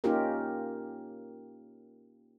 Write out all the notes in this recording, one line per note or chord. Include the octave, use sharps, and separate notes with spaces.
A#3 C#4 D#4 F4 G4 A#4